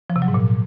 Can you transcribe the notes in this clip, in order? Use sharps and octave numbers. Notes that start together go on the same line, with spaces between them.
F3
C3
F#3
G#2
A#2